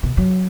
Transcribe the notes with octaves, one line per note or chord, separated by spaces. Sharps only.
B2
F#3